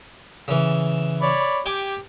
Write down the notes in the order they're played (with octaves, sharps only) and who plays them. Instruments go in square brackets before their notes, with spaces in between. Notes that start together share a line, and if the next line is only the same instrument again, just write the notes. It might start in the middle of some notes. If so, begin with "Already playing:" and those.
[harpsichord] C#3 E3
[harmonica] C#5 D5 B5
[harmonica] G4 [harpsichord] G5 G#5 D6